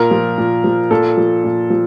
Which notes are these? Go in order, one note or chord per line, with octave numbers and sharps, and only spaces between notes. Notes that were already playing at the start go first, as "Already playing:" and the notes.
Already playing: A#2 A#4
F3
A#2
F3
A#2 A4
F3
A#2
F3